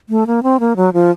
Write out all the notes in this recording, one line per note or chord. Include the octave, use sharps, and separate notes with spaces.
A3
A#3
C4
A#3
F#3
F3